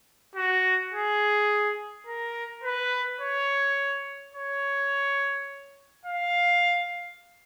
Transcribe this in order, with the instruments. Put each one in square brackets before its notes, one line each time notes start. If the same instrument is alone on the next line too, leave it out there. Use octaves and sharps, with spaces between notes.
[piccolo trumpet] F#4
G#4
A#4
B4
C#5
C#5
F5